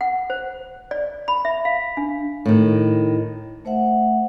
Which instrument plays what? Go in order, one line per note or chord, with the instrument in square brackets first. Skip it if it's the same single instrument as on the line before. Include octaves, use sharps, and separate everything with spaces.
[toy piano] F#5
C5
D5
B5
E5
F5
D4
[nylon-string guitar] A2 D#3
[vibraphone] A3 C5 E5 F#5